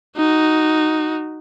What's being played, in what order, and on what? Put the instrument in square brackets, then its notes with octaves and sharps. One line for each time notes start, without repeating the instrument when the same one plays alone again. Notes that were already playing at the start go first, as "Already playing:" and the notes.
[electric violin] D#4 F#4